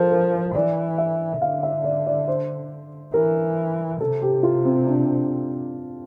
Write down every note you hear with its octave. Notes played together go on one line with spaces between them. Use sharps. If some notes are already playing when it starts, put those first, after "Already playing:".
Already playing: F3 A4 A#4
A#4
C5
E3 D5
E5
D3 F5
E5
D5
D5
C5
E3 A#4
C3 A4
G4
F4
C4
D4